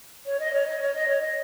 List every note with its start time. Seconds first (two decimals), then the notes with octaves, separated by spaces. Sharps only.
0.26 C#5
0.39 D#5
0.53 C#5
0.67 D#5
0.80 C#5
0.94 D#5
1.08 C#5
1.21 D#5